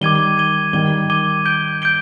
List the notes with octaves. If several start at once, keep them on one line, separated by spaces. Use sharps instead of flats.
D#3 G3 D6 G#6 D#7 G7
D6 G#6 D#7 G7
D#3 G3 D6 G#6 D#7 G7
D6 G#6 D#7 G7
G6 D7 G7
G6 D7 G7